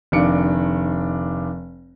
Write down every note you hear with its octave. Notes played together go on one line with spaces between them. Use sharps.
F1 D#3 D4 F5 C#7 D7